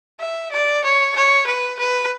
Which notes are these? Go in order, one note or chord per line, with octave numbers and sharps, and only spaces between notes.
E5
D5
C#5
C#5
B4
B4